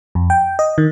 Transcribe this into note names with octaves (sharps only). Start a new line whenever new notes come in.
F2
G5
D#5
D#3